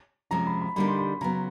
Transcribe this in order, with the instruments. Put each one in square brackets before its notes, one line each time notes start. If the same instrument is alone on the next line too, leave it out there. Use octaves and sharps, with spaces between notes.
[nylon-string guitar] C3 F3 G#3 C#4 [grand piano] A#5
[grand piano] B5
B5
[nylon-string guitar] D3 G3 A#3 D#4 G4 [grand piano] B5
[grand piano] C6
B5
[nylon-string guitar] C#3 F#3 B3 [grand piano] A#5